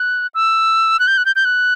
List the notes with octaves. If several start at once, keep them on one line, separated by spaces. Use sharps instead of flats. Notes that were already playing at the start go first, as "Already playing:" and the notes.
Already playing: F#6
E6
F#6
G6
F#6
G6
G6
F#6